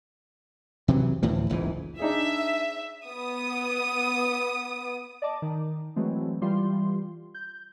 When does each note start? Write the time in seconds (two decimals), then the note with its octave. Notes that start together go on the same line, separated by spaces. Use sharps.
0.88 C3 E3 F#3
1.22 D2 A2 E3 F3
1.50 F#1 C#2 G#2 E3
1.99 D4 D#4 G#4 E5
3.08 B3 D#6
5.22 D5 D#5 A5 D6
5.42 D#3
5.96 E3 F#3 G#3 A3 C4
6.41 E3 G3 F4 C6
7.34 G6